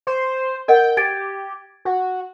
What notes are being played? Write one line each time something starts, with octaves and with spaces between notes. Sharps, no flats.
C5
A#4 D#5 F#5 G5
G4 G#6 A6 D7
F#4